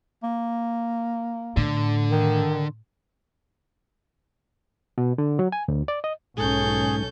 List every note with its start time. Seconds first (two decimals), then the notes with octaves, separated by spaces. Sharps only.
0.23 A#3
1.57 A2 D3
2.12 D#3
4.98 B2
5.18 D3
5.39 F#3
5.52 G#5
5.68 D2
5.88 D5
6.04 D#5
6.37 B1 G#2 C#4 G#4 A4 G6